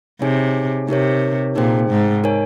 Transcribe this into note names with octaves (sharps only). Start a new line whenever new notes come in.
C3 D#4 G#4 C#5 G#5
C3 D#4 G4 A#4 C#5
A#2 D#4 G#4 C5 G5
G#2
D#4 A#4 C#5 G#5